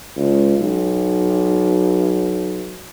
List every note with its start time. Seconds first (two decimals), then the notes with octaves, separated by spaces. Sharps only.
0.17 C#2
0.59 B1